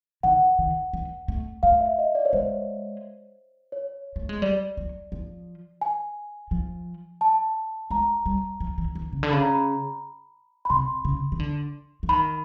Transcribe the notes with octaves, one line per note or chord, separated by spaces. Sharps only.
D#3 F#5
D#3
E3
A3
A3 F5
E5
D#5
D5
C#5
G#3 C5
C#5
A3
G#3
G3 D5
F#3
F3
G#5
F3
A5
G#3 A#5
G3
F3
E3
E3
C#3
D3
C#3 B5
A#5
B5
B5
C3 C6
C#3
D#3
D3
E3
D#3 B5